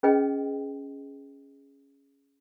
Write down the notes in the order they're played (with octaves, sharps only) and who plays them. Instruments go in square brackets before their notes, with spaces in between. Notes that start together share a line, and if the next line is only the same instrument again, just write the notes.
[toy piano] C#4 G#4 B4 D#5 G5